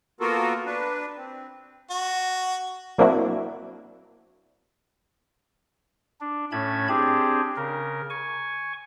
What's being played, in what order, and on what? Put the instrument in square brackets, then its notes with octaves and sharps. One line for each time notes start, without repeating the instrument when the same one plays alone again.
[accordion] A#3 B3 F4 F#4 A4 A#4
D4 B4
C4
[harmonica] F#4
[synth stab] F#3 A#3 C4 D4 E4 F#4
[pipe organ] D4
A2 A3 C#4 A5 B5 G#6
C4 D4 G4 G#4
C#3 A#4
G#5 C#6